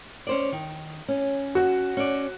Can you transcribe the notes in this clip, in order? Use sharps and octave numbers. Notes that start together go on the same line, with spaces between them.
C#4 C5 D5
D#3
C#4
F#4
C#4 D5